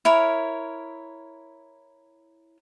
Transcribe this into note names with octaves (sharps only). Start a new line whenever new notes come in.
E4 A#4 C#5